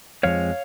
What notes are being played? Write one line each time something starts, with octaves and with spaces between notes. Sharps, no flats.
F2 F3 G#3 C#5 F5